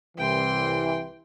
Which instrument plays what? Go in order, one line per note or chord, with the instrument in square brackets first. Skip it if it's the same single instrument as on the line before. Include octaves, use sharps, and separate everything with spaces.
[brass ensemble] C2 E3 [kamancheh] G5 C6